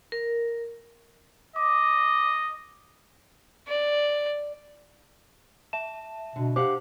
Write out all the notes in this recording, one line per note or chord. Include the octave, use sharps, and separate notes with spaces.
A#4
D#5 D6
D5
E5 A5 E7
B2 D3
G4 C5 F5 F#5 D6